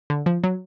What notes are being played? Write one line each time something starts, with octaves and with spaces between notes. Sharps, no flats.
D3
F3
F#3